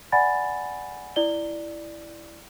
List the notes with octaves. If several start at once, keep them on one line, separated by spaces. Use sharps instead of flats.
D5 F#5 G#5 B5 A6
E4 D5 G7